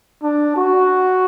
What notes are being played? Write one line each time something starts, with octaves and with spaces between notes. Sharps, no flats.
D4
F#4